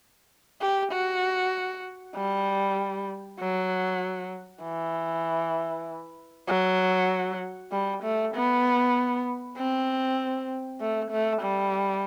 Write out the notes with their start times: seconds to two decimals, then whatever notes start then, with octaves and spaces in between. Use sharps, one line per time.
0.61 G4
0.92 F#4
2.15 G3
3.40 F#3
4.63 E3
6.48 F#3
7.72 G3
8.03 A3
8.34 B3
9.57 C4
10.81 A3
11.11 A3
11.42 G3